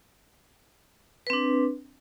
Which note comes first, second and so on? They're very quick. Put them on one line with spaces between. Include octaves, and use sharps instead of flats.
B4 C4 D4